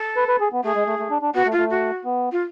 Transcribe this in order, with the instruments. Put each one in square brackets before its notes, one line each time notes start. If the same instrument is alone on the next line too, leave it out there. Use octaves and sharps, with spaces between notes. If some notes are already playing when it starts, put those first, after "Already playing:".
Already playing: [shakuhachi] A4
[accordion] B4
B4
G#4
B3
[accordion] A3 [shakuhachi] G#4
[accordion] G#3
A3
A3
D4
D4
[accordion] B3 [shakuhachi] F#4
[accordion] A3
[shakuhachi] F4
[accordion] A3
[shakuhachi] F#4
[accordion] B3
[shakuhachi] F4